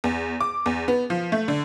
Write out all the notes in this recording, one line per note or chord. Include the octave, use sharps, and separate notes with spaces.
E2
D6
E2
B3
F3
A3
D3